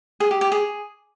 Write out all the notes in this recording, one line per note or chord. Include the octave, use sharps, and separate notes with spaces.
G#4
G4
G4
G#4